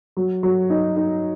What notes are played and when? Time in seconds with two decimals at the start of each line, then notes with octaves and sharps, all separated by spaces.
0.17 F#3
0.43 F#3
0.70 D#4
0.96 D#4